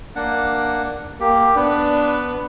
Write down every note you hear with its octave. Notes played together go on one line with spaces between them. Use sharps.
A#3 D4 F#5
A#3 G4
B3 D4 B4